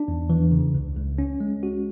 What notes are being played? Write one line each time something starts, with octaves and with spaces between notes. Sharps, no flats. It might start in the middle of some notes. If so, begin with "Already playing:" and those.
Already playing: D4
E2
E3
C#3
C#2
C#2
C#4
G#3
F#4